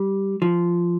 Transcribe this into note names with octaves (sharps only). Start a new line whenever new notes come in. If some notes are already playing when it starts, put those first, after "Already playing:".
Already playing: G3
F3